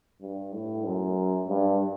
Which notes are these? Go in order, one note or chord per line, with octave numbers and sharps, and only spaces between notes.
G2
A2
F#2
G2